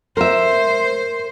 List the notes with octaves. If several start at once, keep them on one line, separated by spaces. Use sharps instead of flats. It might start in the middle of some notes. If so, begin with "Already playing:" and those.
A#4 C5 E5